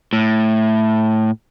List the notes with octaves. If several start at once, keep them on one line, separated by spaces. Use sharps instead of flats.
A2